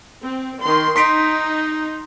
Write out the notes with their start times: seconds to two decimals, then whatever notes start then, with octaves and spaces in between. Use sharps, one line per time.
0.22 C4
0.60 D#3 C6
0.96 D#4 C6 B6 D7